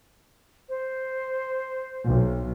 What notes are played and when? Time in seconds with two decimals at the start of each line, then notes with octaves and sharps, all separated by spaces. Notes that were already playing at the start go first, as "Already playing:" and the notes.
0.69 C5
2.07 B1